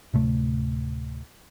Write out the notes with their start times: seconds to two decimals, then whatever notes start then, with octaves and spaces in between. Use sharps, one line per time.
0.14 D1 C3 A3